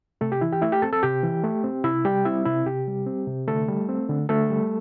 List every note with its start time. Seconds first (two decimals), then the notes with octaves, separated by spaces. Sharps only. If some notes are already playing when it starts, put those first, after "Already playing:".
0.21 C3 A3 A4
0.32 G4
0.41 E3 E4
0.52 G4 G5
0.62 A3 E4 E5
0.72 G4 G5
0.82 C4 A4 A5
0.93 A4 A5
1.03 C3 G4 G5
1.24 E3
1.43 A3
1.64 C4
1.84 C3 E4 E5
2.05 G3 G4 G5
2.25 C4 E4 E5
2.46 C3 E4
2.66 C3 G4
2.87 G3
3.07 C4
3.27 C3
3.48 D3 A3 A4
3.68 G3
3.89 C4
4.09 D3
4.29 D3 A3 A4
4.50 G3